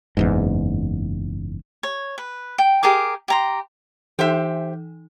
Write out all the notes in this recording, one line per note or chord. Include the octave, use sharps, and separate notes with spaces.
F#1 E2 G#2
C#5
B4
G5
G4 G#4 A#4 D6
G4 A#5 C6
E3 D#4 G4 C5 E5